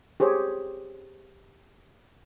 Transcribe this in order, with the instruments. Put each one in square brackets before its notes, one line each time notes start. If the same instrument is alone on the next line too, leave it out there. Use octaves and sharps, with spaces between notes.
[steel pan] G4 G#4 C5 C#5